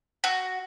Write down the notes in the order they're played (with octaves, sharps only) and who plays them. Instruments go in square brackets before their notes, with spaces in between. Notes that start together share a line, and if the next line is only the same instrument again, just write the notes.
[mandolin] F#4